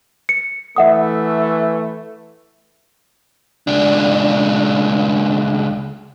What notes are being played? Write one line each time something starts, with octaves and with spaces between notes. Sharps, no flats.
C#7
E3 A3 E5 F#5 D#6
C#2 D4